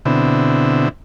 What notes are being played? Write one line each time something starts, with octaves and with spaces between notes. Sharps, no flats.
B2 D3 C4 E4